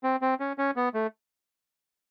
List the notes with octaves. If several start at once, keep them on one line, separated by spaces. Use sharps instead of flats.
C4
C4
C#4
C#4
B3
A3